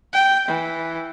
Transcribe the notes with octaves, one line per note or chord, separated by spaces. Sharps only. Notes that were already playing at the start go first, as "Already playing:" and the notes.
G5
E3